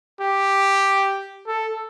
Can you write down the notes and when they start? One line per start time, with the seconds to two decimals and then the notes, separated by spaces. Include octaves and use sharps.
0.21 G4
1.47 A4